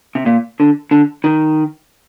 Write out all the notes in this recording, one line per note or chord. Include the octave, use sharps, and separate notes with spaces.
C3
A#2
D3
D3
D#3